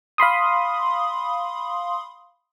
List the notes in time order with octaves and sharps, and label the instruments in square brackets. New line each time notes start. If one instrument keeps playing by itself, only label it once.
[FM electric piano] F5 B5 C6 D#6